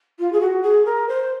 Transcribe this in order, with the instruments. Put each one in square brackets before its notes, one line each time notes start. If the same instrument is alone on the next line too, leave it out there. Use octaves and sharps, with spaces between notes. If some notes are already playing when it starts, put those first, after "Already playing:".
[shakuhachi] F4
G#4
F#4
G#4
A#4
C5